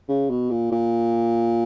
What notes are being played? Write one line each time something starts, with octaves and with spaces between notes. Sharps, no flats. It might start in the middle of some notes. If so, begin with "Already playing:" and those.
C#3
B2
A#2
A#2